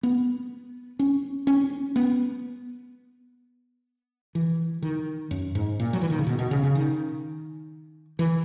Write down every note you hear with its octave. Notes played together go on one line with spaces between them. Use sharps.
B3
C#4
C#4
B3
E3
D#3
F#2
G#2
A#2
F#3
E3
D#3
C#3
B2
B2
C#3
C#3
D#3
E3